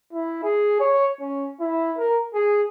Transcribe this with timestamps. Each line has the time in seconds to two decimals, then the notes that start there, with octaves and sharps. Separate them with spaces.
0.13 E4
0.44 G#4
0.80 C#5
1.20 C#4
1.60 E4
1.98 A#4
2.34 G#4